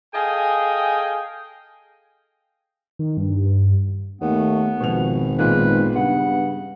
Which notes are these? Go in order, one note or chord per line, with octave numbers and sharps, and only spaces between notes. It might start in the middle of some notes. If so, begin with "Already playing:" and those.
G#4 A4 D#5 F5 G5 G#5
D#3
G2
D#2 A3 B3
G#1 B2 F3 F7
A#2 D#3 G#3 B3 B4
G2 C#3 F#5